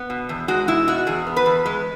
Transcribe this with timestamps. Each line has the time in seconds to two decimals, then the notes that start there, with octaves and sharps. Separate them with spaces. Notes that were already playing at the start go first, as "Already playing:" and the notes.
Already playing: B3
0.10 B2
0.29 E2
0.48 G#3 F#4
0.68 B2 E4
0.87 B2 F#4
1.07 E2 G#4
1.27 B3
1.36 B4
1.46 E2
1.66 G#3